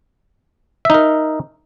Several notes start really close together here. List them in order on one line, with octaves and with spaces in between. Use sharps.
E5 D#4 A#4